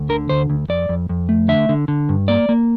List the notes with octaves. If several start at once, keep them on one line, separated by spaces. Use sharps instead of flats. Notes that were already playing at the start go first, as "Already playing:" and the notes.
Already playing: D2
D3 A#4
D2 C5
D2
F2 D5
F2
F2
A3
D3 E5
D3
D3
G2
A#3 D5
A#3